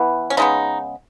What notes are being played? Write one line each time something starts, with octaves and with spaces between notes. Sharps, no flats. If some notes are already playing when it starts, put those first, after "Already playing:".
Already playing: E3 B3
C#4
C#3 G#3 B3 D#4